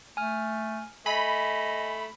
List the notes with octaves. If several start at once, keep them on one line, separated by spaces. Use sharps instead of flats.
A3 G#5 F6
A3 D#5 G#5 B5